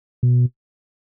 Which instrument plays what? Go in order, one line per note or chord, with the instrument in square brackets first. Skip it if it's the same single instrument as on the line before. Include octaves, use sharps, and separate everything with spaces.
[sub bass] B2